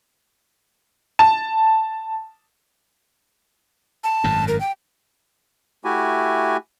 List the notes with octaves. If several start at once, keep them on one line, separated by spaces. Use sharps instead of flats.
A5
A5
G#1 F#2 A2
A#4
G5
A3 E4 F#4 G4 G#5